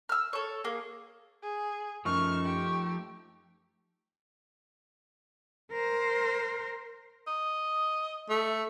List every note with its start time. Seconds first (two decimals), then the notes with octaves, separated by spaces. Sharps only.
0.09 E6 F6
0.33 A4 C#5
0.64 A#3 G#4
1.42 G#4
2.05 F#2 F3 A3 D#4 C#6 F6
2.44 G4
5.72 A#4 C5
7.27 D#5
8.29 A3